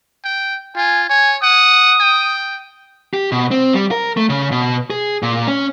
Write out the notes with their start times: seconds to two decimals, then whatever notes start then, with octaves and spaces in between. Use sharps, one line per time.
0.24 G5
0.76 F4 G#5
1.10 C#5 G#5
1.43 F#5 D#6
2.00 G5
3.14 G4
3.32 B2
3.51 C4
3.74 G3
3.91 A#4
4.17 A3
4.30 C#3
4.52 B2
4.90 G#4
5.23 A#2
5.48 C#4